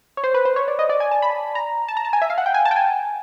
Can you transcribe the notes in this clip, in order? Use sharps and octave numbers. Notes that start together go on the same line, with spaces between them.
C#5
C5
B4
C5
C#5
D5
D#5
D5
G#5
A5
B5
A#5
A5
A#5
A5
G#5
E5
F5
F#5
G5
G#5
A5
G5
G#5